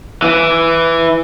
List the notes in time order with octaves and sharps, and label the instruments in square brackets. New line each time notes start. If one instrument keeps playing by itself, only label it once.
[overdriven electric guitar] E3